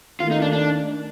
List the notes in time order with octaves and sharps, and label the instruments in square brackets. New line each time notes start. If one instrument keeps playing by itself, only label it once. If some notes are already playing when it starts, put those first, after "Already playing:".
[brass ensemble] D#2 D#3 A3 [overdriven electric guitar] F4
[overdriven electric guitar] D#4
D4
D4